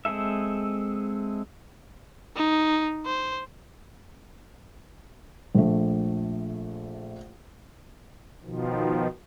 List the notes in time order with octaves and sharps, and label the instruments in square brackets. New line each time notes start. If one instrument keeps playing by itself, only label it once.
[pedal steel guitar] G#3 C4 G#4 A4 E5
[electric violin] D#4
C5
[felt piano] A#1 A3
[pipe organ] B2 D#3 F3